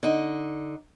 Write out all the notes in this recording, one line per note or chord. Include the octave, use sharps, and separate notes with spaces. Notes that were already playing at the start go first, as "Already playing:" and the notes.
D3 D#4